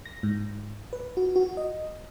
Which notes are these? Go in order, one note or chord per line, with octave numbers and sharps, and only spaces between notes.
A#6
G#2
B4
F#4
F#4
D#5